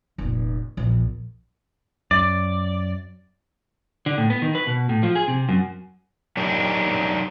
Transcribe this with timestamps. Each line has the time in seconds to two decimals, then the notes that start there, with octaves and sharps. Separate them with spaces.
0.18 F1 A#2
0.77 A#1 E2
2.11 F#2 D5
4.06 D3
4.18 A2
4.30 B3
4.42 D#3
4.55 B4
4.67 B2
4.89 A2
5.03 F3
5.15 G#4
5.28 C3
5.49 F#2
6.37 F#3 D4 D#4 G4 A#4